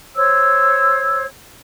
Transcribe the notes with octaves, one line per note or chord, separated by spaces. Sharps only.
C5 C#5 E6